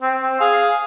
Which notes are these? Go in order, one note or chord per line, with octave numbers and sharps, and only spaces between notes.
C4
C4
G#4 F5